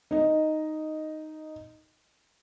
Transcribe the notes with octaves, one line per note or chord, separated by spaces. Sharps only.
D#4 D#5